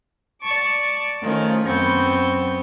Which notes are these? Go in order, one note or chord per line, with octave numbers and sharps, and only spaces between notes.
D5 A5 C#6 D6
D#3 F3 A3 C#4
F#2 B3 C4 C#6 G6